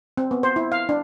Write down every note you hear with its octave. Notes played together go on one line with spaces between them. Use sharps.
C4
B3
C5
E4
F5
D4